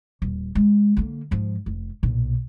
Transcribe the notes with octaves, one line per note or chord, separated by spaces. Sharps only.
D#1
G#3
D3 A#3
G#2 F3
F1
B1 A#2